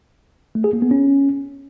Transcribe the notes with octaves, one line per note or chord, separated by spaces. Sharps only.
A3
G#4
A#3
B3
C#4